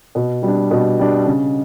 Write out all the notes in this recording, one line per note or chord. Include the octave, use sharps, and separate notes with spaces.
B2
G3 D4
B2
G3 D4
C#3